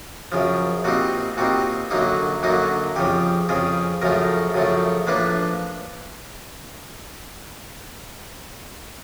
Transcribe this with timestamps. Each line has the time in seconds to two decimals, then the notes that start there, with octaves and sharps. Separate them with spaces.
0.32 F#2 C#3 F3
0.84 A#2 G3 C4 D#4 F#4
1.37 A#2 G3 C4 D#4 F#4
1.90 F#2 D3 F#3 A#3 D#4
2.43 F#2 D3 F#3 A#3 D#4
2.96 F2 C#3 F3 G4
3.49 F2 C#3 F3 G#4
4.02 F#2 C#3 F3 A3 A#4
4.54 F#2 C#3 F3 A3
5.07 A2 F3 A#3 D4 B4